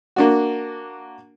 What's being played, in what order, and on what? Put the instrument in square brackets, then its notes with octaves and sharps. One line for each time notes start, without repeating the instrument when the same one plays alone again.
[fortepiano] A#3 D4 F#4